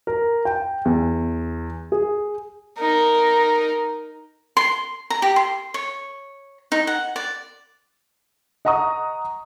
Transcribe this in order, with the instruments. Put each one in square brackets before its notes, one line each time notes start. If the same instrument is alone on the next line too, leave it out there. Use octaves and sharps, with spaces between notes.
[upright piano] A#4
G5
E2
G#4
[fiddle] D#4 A#4
[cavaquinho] C6
A#5
G4
C6
C#5
D#4
F#5
D5
[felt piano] D#5 F#5 A#5 C#6 D#6